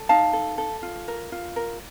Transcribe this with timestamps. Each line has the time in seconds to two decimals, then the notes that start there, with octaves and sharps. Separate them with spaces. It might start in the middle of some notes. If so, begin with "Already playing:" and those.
Already playing: A4
0.09 D#4 F5 A5
0.33 A4
0.58 A4
0.83 F4
1.08 A#4
1.32 F4
1.56 A#4